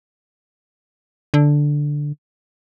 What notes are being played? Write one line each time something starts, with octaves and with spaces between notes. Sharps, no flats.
D3